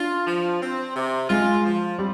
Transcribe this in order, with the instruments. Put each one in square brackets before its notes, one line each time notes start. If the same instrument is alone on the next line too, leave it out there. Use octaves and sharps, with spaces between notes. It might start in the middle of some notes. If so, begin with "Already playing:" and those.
Already playing: [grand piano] D4 [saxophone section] F4
[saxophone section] F3
C4
C3
[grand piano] G#3 [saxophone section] F4
[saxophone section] F3
[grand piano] G3 [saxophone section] C4